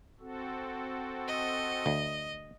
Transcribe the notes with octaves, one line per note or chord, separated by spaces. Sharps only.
C4 F#4 A4
D#5
D2